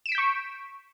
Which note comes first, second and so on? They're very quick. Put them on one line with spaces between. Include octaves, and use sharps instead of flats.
E7 D7 B6 G6 C#6